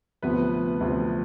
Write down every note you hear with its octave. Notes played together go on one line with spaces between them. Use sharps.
D2 C3 F3 B3 B4
D2 C3 F3